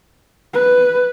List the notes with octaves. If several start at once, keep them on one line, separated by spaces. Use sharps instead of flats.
B4